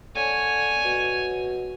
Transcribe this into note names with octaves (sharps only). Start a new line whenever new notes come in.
D3 C#5 G#5
B2